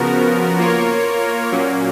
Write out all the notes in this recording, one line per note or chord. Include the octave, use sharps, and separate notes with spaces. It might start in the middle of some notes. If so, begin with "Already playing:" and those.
Already playing: C#3 F3 B3 F#4 A#4
A#3 F4 A#4 C#5
A#2 F#3 A#3 C#4